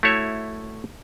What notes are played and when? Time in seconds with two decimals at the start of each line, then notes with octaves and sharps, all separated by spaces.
0.03 A3 E4 F#4 C#5 E5